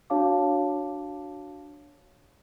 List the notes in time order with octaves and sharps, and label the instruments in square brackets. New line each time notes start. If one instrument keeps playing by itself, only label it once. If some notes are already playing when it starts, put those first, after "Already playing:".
[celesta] D4 F#4 C#5 F5 A5 D6